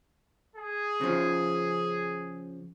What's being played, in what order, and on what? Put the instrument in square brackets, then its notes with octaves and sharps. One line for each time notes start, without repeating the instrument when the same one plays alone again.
[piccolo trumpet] G#4
[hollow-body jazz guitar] C#3 F3